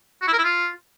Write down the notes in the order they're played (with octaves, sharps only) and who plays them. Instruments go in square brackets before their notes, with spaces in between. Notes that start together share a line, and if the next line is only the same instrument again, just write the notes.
[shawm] F#4
E4
A#4
E4
F4